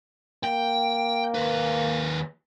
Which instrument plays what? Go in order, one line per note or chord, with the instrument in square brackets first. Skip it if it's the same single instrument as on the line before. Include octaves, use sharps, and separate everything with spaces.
[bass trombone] A#3 [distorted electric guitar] G5
[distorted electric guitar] D#2 B4